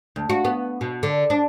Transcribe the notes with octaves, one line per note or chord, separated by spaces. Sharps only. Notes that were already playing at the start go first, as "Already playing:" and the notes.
D2
F#4
B3
B2
D3
D4